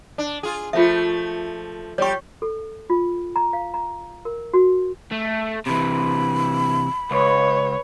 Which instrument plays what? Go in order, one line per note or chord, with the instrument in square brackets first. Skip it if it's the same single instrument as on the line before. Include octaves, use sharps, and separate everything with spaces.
[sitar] D4
F4 G#4
[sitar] F3 A3 [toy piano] F4 E5
[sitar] G3 G4 [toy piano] C#5 C#6
[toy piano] A4
F4
A#5
F5
A#5
A#4
F#4
[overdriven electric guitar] A3
[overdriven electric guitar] C3 E3 [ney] B5
[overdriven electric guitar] C#2 [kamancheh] B4 C#5